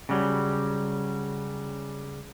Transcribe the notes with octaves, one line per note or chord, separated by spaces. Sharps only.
C#3 F#3 G3